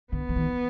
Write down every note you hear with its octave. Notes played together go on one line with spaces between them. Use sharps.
D3 B3
E3
D#3